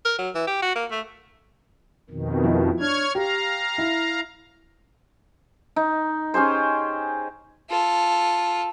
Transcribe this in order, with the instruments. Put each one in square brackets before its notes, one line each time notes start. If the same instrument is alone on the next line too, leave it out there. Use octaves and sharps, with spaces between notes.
[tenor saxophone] A#4
F#3
E3
G4
F#4
A#3
A3
[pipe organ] F2 B2 D#3
[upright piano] F3 E4
[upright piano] D4 [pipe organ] C#5 F6 G#6
[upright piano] G4 [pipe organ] F5 A#5
[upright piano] E4
[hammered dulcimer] D#4
C#4 G4 G#4 C5
[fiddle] F4 A4